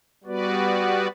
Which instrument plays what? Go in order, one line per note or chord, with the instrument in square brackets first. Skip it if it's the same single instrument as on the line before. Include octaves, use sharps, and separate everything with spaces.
[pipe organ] G3 B3 F#4 B4 D5